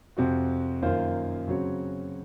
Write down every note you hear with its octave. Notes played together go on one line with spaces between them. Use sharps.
F2 C3 F3 C4 F#4
F#2 D#3 A#3 F4 C5
C#3 F#3 C4 F#4 C#5